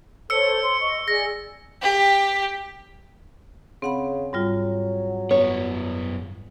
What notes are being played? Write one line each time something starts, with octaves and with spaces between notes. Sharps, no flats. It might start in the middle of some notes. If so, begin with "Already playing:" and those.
A4 C5 C#5 E6 C#7
C6
D#5 C#6
G#4 D5 A#6
G4
C#3 C4 F#5 B5
G#2 F#3 G3 F4
F#2 B3 C#5